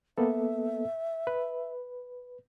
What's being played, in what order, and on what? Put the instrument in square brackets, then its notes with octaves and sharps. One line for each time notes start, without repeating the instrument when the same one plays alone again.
[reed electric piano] A#3 B3 A4 [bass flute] E5
[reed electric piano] B4